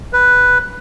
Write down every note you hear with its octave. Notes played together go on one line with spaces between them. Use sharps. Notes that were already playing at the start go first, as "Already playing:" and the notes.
B4